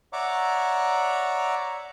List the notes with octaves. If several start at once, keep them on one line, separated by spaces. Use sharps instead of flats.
C#5 D5 E5 F#5 A#5 D6